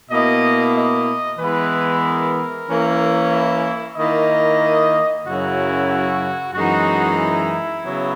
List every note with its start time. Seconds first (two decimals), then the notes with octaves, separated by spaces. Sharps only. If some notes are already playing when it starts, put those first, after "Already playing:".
0.11 B2 A#3 E4 D#5
0.75 D#5
1.39 E3 G#3 B3 E4 B4
2.04 A#4
2.68 E3 A#3 C#4 E4
3.32 E4
3.97 D#3 A#3 E4 D#5
5.25 F#2 C#3 F#3 C#4 E4 F#4
5.89 F#4
6.54 F#2 E3 G#3 D#4 F#4
7.18 E4
7.83 C#3 F#3 B3